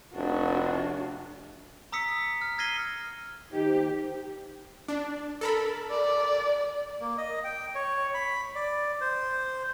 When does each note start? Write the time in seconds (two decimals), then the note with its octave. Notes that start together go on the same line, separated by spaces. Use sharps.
0.14 F1 D4 F#4
1.92 A#5 D#6 E6 B6 C#7
2.41 F6
2.58 F6 G#6 A#6 C7 D#7 G7
3.52 D#3 D#4 G4 C5
4.88 D4
5.41 A4 A#4 B5
5.90 D5
7.00 A#3
7.18 D#5
7.44 G5
7.75 C#5
8.14 B5
8.56 D5
9.01 C5